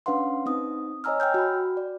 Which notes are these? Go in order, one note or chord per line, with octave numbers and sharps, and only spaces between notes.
C#4 D4 B4 F5 F#5 C6
C4 D#4 D#6
C#5 D#5 G#5 A#5 E6 F6
G5 E6 F6 G6
F#4 B5
D5